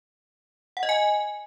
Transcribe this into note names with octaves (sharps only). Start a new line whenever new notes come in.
F#5
D#5
G#5